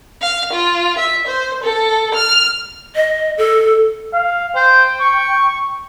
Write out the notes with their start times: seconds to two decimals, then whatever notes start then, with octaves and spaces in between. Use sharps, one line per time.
0.22 F5
0.53 F4
0.99 E5
1.27 C5
1.63 A4
2.14 F6
2.95 D#5
3.38 A4
4.14 F5
4.56 C5 G5
5.00 C#6